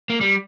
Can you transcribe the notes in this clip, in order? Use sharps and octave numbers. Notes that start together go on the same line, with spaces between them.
A#3
G3